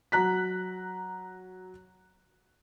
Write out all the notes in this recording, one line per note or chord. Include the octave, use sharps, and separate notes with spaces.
F#3 A#5 F#6 B6